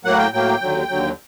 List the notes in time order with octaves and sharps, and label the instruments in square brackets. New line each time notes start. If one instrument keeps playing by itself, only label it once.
[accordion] A2 F#3 A#3 F#5
G5
A2 F#3 A#3 G5
D#2 D3 F#3
D#2 D3 F#3